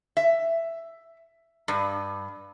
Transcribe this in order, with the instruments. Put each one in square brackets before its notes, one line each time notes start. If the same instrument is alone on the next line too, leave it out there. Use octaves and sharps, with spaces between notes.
[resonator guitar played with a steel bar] E5
G2